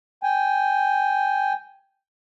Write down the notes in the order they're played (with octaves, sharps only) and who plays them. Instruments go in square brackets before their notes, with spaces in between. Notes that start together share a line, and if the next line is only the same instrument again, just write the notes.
[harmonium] G5 G#5